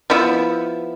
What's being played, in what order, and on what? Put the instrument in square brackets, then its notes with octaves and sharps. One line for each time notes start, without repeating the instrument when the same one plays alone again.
[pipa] F3 B3 E4